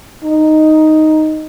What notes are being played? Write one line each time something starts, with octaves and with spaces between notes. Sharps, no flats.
D#4